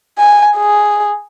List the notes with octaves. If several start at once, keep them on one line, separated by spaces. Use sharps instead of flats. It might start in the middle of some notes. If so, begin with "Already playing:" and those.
G#5
G#4